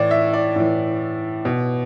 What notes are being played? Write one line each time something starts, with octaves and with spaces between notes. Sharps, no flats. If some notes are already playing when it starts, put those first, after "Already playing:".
Already playing: A2 E3 D5
E5
D5
A2 E3
B2